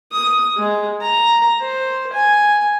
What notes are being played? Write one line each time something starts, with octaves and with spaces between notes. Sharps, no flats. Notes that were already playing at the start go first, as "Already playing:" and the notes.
D#6
G#3
A#5
C5
G#5